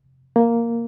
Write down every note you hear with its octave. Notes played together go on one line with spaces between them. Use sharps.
A#3